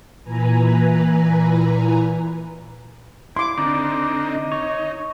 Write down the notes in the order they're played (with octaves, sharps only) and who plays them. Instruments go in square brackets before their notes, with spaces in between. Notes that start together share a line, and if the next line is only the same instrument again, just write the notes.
[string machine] A#2 E3 B4 G#5 A#5
[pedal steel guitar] E4 [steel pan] C6 D6
[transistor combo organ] D3 C4 D#4 [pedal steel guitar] D5 [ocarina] A#5
[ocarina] D#5
[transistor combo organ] D#4 [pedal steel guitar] C#5